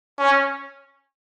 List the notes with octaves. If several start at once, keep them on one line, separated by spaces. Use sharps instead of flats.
C#4